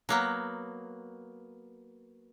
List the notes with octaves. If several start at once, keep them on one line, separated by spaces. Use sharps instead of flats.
F#3 A#3 B3